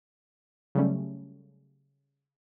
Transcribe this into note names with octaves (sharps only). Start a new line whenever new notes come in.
C#3 F#3 G3 A3 C#4